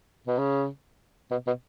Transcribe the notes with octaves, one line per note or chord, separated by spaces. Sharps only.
B2
C#3
B2
B2